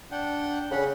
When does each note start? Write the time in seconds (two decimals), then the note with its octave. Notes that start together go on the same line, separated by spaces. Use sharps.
0.11 D4 F#5 G5
0.71 C#3 F#5 B5